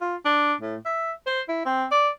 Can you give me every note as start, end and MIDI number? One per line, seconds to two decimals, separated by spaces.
0.01 0.16 65
0.25 0.54 62
0.61 0.76 45
0.86 1.12 76
1.27 1.41 72
1.49 1.63 64
1.65 1.86 60
1.91 2.09 74